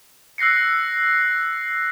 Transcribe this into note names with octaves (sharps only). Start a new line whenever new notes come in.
E6 F#6 A#6 C7 C#7